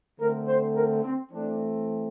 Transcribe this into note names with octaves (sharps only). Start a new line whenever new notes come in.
D3 A3 C4 A#4
C5
A#4
C4
E3 A3 C4 D4